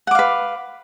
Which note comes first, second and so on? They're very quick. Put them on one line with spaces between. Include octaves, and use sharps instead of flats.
F#5 D6 F5 B4